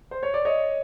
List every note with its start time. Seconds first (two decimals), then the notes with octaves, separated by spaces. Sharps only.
0.11 C5
0.23 C#5
0.34 D5
0.45 C#5 D#5